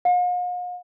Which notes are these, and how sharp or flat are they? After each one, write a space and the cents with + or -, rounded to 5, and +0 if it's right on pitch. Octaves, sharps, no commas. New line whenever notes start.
F5 +45